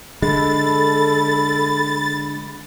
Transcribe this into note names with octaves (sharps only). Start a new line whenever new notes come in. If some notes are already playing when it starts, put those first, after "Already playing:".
D3 G#3 A4 B5 A6